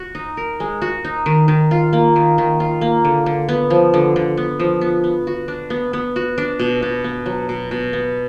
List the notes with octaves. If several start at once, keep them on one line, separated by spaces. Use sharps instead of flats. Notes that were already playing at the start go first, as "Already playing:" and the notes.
Already playing: F#4
D#4
A#4
G#3
F#4
D#4
D#3
D#3
F4
A#3
D#3
D#3
F4
A#3
D3
D3
B3
F3
D3
D3
B3
F3
B3
B3
F#4
D4
B3
B3
F#4
D4
B2
B2
B3
F#3
B2
B2
B3